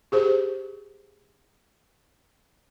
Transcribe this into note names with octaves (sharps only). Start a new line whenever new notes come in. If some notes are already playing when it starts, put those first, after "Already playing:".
G4 G#4 C5